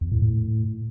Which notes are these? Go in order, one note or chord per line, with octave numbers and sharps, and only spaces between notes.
E2
A2
A2